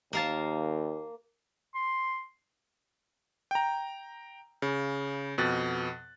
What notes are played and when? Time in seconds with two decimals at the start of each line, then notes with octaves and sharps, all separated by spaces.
0.13 D#2 A#3 F5 A5
1.75 C6
3.51 G5 A#5
4.62 C#3
5.38 F2 B2 F#6 A6